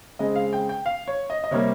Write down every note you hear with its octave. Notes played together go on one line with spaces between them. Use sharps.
C#3 G#3 C4 D#5
F5
G5
G5
F5
C#5
D#5
D#5
C3 G3 A#3 C#5